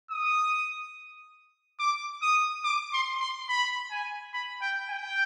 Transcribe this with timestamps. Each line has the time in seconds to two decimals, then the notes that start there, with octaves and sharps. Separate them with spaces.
0.11 D#6
1.79 D6
2.22 D#6
2.64 D6
2.93 C6
3.20 C6
3.49 B5
3.90 G#5
4.33 B5
4.62 G5
4.90 G5